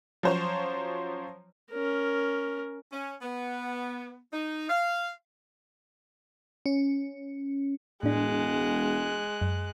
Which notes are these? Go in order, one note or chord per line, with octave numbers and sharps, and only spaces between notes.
F3 F#3 C#4 C5 C#5
C#4 A#4
C#4
B3
D#4
F5
C#4
E1 A2 G#3 D4 F#6
F#2